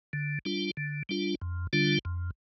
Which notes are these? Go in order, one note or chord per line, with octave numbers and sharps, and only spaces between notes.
D3
G3 D4 F4
D3
G3 D4 F4
F2
D3 G3 D4 F4
F2